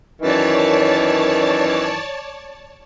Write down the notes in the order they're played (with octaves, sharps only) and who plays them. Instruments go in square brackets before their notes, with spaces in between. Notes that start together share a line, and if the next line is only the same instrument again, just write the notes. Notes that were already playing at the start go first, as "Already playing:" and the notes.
[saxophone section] F#2 D#3 E3 [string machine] C#5 D5 A5